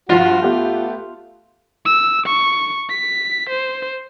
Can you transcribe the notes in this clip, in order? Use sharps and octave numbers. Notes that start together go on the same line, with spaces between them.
G2 F3 F4 F#4
A3 B3 G4
E6
C#6
B6
C5